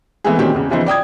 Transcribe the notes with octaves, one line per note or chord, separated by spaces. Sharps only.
E3 G#3 A3 B3 C4 G#4
A#2 D#3 F#3 C4 C#4 G4
E2 C#3
C#3 E3 F3 B3 D#4 C5
D5 G5 D#6 G#6